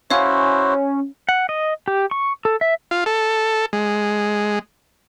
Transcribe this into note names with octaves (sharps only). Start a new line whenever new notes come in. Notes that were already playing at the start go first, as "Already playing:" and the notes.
C#4 E4 F#4 C5 C#5 F5
F#5
D#5
G4
C#6
A4
E5
F4
A4
G#3